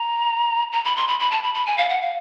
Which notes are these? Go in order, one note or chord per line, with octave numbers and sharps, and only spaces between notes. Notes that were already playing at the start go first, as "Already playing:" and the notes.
Already playing: A#5
A#5
B5
C6
B5
B5
A5
B5
B5
G#5
F5
F#5
F5